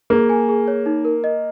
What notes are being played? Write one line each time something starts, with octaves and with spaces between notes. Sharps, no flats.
A#3 G#4
G#5
G#4
C#5
D#4
A#4
D#5